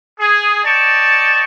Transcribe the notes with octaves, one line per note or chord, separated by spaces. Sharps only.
G#4
D5 D#5 G5 A5 C#6